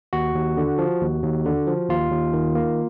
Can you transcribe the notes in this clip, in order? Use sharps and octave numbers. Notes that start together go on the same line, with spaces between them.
D#2 F#4
D#2
D3
F3
D#2
D#2
D3
F3
D#2 F4
D#2
D#3
A#3